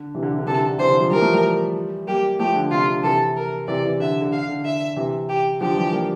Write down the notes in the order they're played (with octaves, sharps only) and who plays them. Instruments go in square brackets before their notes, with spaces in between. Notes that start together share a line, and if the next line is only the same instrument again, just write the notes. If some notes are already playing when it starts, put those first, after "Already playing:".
Already playing: [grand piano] D3
C3 E3
D3
C3
D3
[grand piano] C3 E3 [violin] A4
[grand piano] D3
D3
[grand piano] C3 E3 [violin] C5
[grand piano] D3
D3 F3
[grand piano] E3 G3 [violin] A#4
[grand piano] F3 A3
E3 G3
[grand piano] G3 A#3 [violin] G4
[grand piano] F3 A3 [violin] G4
[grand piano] D3
[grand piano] C3 [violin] F4
[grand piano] D3
[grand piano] C3 E3 [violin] A4
[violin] A#4
[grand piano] C3 E3 [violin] D5
[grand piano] C3 E3
[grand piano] D3 [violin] E5
[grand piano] D3
[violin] F5
[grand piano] D3
[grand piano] D3 [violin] E5
[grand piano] C3 E3
[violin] G4
[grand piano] D3 F3 [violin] G4
[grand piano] E3 G3
G3 A#3